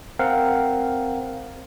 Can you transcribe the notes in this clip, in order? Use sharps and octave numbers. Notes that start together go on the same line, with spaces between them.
C4 A#4 F5 F#5